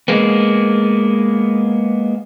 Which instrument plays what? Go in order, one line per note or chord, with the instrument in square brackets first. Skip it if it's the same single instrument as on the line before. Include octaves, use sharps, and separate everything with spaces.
[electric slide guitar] G#3 A#3 B3